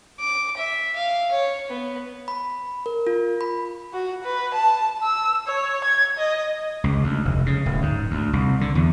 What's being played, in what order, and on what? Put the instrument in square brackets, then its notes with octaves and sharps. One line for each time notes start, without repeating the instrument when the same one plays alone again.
[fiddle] D6
E5
F5
C#5
B3
[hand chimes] B5
A#4
F4
B5
[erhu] F#4
B4
A5
E6
C#5
G#6
D#5
[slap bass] C#2
D2
F1
C#3
D1
G#2
D2
C2
D3
E2